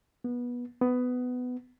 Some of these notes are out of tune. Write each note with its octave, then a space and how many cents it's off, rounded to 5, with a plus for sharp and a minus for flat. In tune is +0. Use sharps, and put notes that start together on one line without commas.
B3 -20
B3 +15